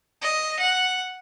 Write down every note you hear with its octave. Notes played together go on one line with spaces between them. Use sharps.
D#5
F#5